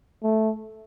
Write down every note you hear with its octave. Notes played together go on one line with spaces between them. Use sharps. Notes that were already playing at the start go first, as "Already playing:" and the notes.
A3